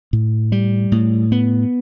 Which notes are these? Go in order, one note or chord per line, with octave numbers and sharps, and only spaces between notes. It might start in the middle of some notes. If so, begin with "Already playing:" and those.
A2
G3
A2
B3